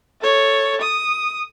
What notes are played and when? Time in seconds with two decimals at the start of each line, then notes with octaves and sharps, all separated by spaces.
0.21 A4 C#5
0.81 D#6